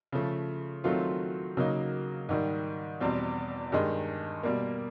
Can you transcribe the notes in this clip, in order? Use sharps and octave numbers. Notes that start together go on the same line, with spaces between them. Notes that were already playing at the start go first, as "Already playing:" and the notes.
C#3 F3 A3
D#3 F#3 A3 C4 F4
C#3 F#3 A#3 D#4
G#2 D#3 G3
E2 B2 G3 C4
G2 D#3 G#3
B2 G3 A#3